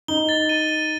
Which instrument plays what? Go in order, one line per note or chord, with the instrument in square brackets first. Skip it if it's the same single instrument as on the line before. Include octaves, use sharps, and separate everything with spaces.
[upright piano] D#4 [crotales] G7
[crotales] A6
D#7
D#7